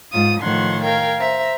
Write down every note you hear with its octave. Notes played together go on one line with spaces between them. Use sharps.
G#2 F4 D#6
A2 D#3 F3 F#5 C6 G#6
A#4 F5 G5 G#6
C5 E5 A#5